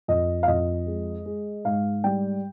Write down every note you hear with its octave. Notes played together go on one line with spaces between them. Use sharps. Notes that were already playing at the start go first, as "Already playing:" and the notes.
F2 D#5
F5
F2 D#5
G#3
G#3
G#2 F5
G3 G5